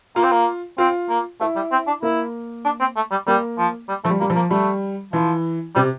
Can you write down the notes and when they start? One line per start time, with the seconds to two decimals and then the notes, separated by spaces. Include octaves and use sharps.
0.16 A#3 F4
0.23 C4
0.31 A#3
0.78 C4 F4
1.09 A#3
1.40 A3 E4
1.56 G3
1.72 C4
1.87 D4
2.03 A#3 E4
2.65 D4
2.80 C4
2.96 A3
3.11 G3
3.27 G3 A#3
3.58 F3
3.89 G3
4.04 F3 A3
4.10 G3
4.20 G3 A#3
4.30 F3
4.36 A#3
4.51 G3 A3
5.13 E3 F3
5.75 C3 G3